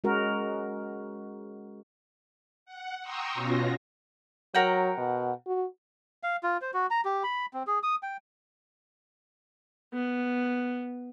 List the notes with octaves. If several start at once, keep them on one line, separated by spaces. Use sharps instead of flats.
G#3 C#4 F#4 A#4
F#5
G5 A#5 C6 C#6 D#6 E6
B2 C#4 F4 F#4 A#6
F#3 A#4 F#5 G5
B2
F#4
F5
F4
C5
F#4
A#5
G4
B5
C4
G#4
D#6
G5
B3